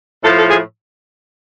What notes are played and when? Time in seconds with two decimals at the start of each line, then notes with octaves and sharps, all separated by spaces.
0.22 A2 F3 A4
0.35 A4
0.48 G#4